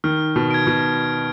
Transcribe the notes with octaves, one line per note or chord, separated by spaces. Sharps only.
D#3 F6
B2
G#6 D7
B2